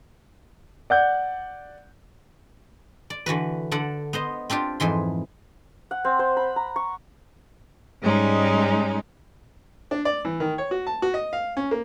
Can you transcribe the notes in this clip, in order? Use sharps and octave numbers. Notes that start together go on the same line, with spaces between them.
D5 F#5 G6
D5
D3 E3 F#4 B4
D3 A4 D5 F#5
B3 C5 D#5
C4 D4 F4 G4
F2 G#2 E3 C6
F#5
C4
C5
B5
A#5
C#6
G#2 G3 G#3 C#4 D#4
D4
D5
E3
D#3
C#5
F#4
A5
F#4
D#5
F5
C#4
A#3